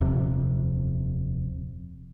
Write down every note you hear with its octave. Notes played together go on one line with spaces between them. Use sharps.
D#1 F2 C3